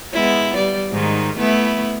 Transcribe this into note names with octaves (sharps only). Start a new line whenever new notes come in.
G#3 B3 E4
G3 D5
G#2 D#3
A3 B3 E4